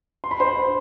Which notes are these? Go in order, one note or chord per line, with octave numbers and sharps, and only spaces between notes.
C6
B5
C5 C6